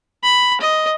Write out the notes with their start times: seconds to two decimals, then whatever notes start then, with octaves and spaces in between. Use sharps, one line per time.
0.23 B5
0.61 D#5